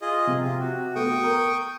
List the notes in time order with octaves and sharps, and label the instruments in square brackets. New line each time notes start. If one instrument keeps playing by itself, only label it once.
[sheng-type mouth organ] F4 G#4 D#5
[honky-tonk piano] C3
[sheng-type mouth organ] F4
F#4
[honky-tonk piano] A3 B3 F#4 [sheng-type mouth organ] G5 C#6 D#6
[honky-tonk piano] A#4